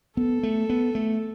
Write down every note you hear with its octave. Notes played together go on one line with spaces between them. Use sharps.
B3 A4
A3
B3
A3